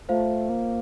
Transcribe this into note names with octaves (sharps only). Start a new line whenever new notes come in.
A3 F4 C5 F5
A#3